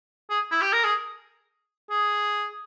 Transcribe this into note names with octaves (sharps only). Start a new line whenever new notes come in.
G#4
E4
G4
A#4
G#4
G#4